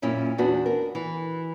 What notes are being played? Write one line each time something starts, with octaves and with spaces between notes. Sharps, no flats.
F#2 A#2 C#4 E4
E2 B3 D4 F#4
A#4
E3